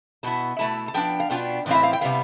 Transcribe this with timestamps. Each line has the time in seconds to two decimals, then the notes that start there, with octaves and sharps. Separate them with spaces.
0.23 B2 B3 E4 A5
0.59 B2 A3 E4 A5
0.88 A5
0.94 F3 B3 D4 G5
1.20 F5
1.30 B2 B3 D4 F4 G5
1.66 A2 E3 C4 E4 F5
1.75 E5
1.83 F5
1.93 G5
2.01 C3 G3 B3 F5